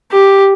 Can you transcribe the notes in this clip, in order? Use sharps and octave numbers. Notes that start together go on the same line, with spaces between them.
G4